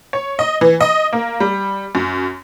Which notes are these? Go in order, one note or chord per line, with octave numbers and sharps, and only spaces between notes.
C#5
D#5
E3
D#5
A#3
G3
F#2